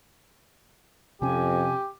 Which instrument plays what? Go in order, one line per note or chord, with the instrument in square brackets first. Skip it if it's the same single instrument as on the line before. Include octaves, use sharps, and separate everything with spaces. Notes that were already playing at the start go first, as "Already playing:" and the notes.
[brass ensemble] F2 [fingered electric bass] C3 C#4 [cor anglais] G4 [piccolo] G#5